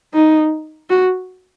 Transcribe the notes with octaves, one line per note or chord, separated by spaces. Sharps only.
D#4
F#4